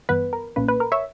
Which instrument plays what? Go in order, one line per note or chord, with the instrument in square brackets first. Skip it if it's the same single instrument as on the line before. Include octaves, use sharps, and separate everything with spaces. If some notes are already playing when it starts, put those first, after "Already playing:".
[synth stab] G2 E3 G3 B3 B4
A#4
B1 A#2 A#3 C#4 B4
B4
A#4
C#5 E5